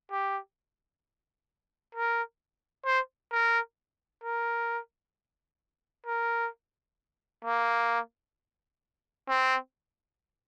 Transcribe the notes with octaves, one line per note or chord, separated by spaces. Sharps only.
G4
A#4
C5
A#4
A#4
A#4
A#3
C4